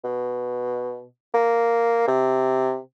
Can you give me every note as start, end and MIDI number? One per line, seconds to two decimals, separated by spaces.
0.04 1.05 47
1.34 2.03 58
2.08 2.78 48